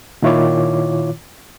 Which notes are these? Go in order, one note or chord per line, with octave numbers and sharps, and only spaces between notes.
A#2 D#3 E4 F4 C#5 D6